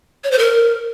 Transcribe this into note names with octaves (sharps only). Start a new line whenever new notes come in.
C#5
C5
A#4